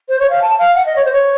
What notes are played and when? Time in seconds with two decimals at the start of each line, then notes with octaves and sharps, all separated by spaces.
0.09 C5
0.20 C#5
0.30 F5
0.42 A5
0.58 F5
0.75 F#5
0.86 D#5
0.96 C#5
1.05 C5
1.13 C#5